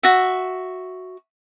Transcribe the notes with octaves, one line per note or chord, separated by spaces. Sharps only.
F#4 E5